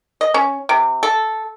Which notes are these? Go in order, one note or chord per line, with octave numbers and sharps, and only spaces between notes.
D#5
C#4
C3
A4